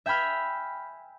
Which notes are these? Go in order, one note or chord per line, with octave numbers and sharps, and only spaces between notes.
E5 G5 G#5 B5 F6